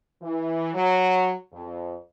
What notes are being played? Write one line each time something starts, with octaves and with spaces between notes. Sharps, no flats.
E3
F#3
F2